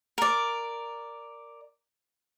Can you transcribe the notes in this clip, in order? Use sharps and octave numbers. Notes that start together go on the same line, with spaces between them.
A#4 D5